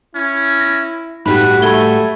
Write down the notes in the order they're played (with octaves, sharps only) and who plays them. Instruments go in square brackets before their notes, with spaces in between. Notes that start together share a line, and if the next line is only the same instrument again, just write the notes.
[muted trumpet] C#4 [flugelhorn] E4
[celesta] A#6
[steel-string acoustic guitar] A2 G3 F#4 [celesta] D#4 B5 [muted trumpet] B4
[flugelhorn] A3 [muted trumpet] G#5 [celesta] B5 G7